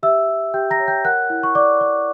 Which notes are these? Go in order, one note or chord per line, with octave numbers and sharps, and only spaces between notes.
G4 E5 E6
G4
G4 G5 G6
A#5 A#6
C#5
G5 G6
A#4 F#5 F#6
E4
C#6
D5 D6
D5